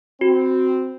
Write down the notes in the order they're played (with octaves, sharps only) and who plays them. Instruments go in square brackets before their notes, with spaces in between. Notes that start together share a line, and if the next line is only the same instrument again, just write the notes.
[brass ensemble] C4 [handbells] F#4